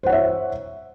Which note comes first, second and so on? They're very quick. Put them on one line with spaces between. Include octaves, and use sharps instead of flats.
C5 F#5 C#5 E5